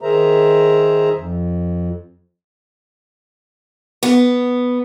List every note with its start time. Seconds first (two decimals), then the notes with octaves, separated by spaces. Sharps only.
0.01 D#3 G#4 A#4 C5 E5 A#5
1.15 F2
4.03 B3